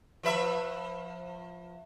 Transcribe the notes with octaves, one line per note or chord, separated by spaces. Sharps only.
F3 B4 E5